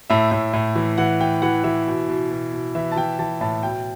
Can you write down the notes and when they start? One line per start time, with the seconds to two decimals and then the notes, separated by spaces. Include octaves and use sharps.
0.10 A2 E5
0.32 A2
0.53 A2
0.76 E3
0.98 E3 F#5
1.20 E3 G5
1.42 E3 F#5
1.64 E3 E5
1.87 B2
2.09 B2
2.30 B2
2.52 B2
2.75 E3 E5
2.92 A5
2.96 E3 G5
3.19 E3 A5
3.41 A2 A5
3.63 B2 G5